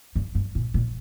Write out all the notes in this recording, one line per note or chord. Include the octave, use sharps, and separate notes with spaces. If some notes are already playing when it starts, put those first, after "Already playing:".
G2
G2
A#2
A#2